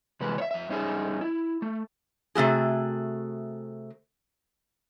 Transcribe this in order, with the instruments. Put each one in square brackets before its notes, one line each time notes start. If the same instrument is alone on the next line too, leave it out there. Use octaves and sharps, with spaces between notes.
[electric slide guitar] C3 E3 G#3 B4
C#5 E5
F2 E5
G2 C#4 D#4 G#4 E5
E4
A3
[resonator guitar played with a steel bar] C3 A3 F#4 G#4